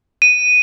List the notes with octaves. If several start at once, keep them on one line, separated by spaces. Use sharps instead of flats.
D#7